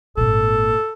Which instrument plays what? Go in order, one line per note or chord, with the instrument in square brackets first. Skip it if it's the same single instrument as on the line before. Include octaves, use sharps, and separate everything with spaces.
[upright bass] G#1 A#2 [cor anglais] A4